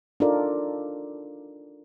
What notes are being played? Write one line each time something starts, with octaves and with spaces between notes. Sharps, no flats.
D4 D#4 F4 A4 A#4 D5